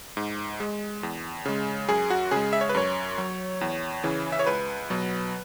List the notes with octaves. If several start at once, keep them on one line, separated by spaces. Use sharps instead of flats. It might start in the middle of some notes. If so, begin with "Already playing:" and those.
G#2
G#3
E2
C#3 G#3
F#2 G#4
F#4
C#3 G#3 G#4
E5
C#5
B4
F#2 C#5
F#3
E2
C#3 E3
E5
C#5
C#2 B4
B2 F#3